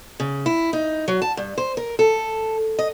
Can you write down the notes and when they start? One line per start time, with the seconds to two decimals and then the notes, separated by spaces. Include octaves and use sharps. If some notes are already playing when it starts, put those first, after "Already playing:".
0.20 C#3
0.46 E4
0.73 D#4
1.08 F#3
1.22 A5
1.37 G2
1.58 C5
1.77 A#4
1.99 A4
2.79 D#5